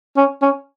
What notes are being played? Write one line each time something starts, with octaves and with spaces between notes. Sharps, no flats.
C#4
C#4